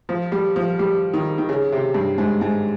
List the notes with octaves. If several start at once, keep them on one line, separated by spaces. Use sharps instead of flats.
F3
G3
F3
G3
D#3
D#3
C#3
C3
G2
G#2
G#2